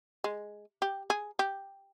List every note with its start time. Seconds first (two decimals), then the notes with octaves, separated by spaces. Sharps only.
0.24 G#3
0.82 G4
1.10 G#4
1.39 G4